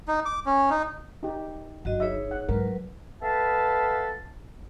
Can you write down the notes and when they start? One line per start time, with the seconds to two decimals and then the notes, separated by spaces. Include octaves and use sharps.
0.08 D#4
0.25 D6
0.46 C#4
0.70 D#4
1.23 D#4 G4
1.85 G1 F#3 F#4 D#5
2.00 D#4 G#4 C#5 E5
2.31 F#5
2.49 G#2 F#3 A#4 B4
3.22 B3 A4 B4 E5 F5 A5